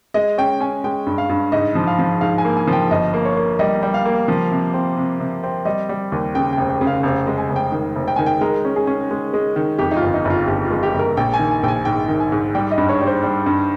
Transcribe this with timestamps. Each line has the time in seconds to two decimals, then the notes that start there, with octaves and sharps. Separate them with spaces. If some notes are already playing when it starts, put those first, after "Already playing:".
0.14 G#3 D#5
0.38 C#4 G5
0.60 C#4 G#5
0.84 G#3 G5
1.06 G2
1.18 F5
1.29 G2
1.52 G#2 D#5
1.75 F3
1.87 F5
1.99 F3
2.21 G#2 F5
2.38 G#5
2.45 A#3
2.57 G#5
2.68 F3
2.73 G5
2.91 G1 D#5
3.14 A#3
3.25 C#5
3.37 A#3
3.59 G3 D#5
3.83 G3
3.94 F5
4.05 A#3
4.28 F3
4.51 C3
4.74 C4
4.97 C3
5.20 C3
5.43 C4
5.65 G3 D#5
5.89 G3
6.12 D#2
6.35 C#3 G5
6.53 F1 G5
6.70 G5
6.81 C#3
6.87 F5
7.03 F1 F5
7.27 G#3
7.38 G#5
7.50 F1
7.56 G5
7.72 D#3
7.95 F1
8.08 G5
8.16 D#3 G#5
8.26 G5
8.41 G#3 A#4
8.65 C#4
8.76 G#4
8.87 C#4
9.11 G#3
9.34 G#3
9.56 D#3
9.79 F2 G4
9.91 D#4
9.96 F4
10.02 G1
10.14 D#4
10.25 G1
10.30 F4
10.48 G1 G4
10.65 F4
10.71 G#3
10.83 G4
10.94 G1
10.99 A#4
11.17 A#1 G5
11.34 G#5
11.39 D#3
11.51 G#5
11.63 A#1 G5
11.68 G#5
11.85 G#2 G5
12.08 D#3
12.20 G#5
12.32 G#2
12.55 G3 G5
12.71 D#5
12.78 G2
12.89 C#5
13.01 G3
13.07 C5
13.23 G3
13.46 G2